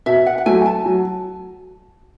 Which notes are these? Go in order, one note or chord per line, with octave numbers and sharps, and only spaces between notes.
B2 E5
F#5
F#5
F#3 A3 G#5
A5
F#3